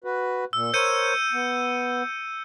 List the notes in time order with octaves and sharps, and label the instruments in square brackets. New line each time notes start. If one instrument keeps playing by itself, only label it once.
[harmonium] F#4 B4
[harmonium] A#2 [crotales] E6
[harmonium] A#4 C5 C#5 [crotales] G6 C#7 D#7
[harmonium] B3